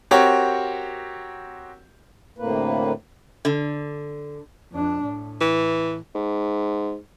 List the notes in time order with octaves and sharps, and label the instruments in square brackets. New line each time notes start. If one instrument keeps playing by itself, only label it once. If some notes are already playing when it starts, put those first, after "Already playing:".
[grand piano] C4 F#4 G4 A#4 C#5
[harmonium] D2 A2 C3 A#3 B4
[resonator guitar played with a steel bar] D3
[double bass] F2 D4
A2
[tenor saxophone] E3
[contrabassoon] G#2